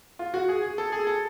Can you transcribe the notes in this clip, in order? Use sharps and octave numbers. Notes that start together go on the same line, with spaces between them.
F4
F#4
G#4
G#4
A4
G#4
A4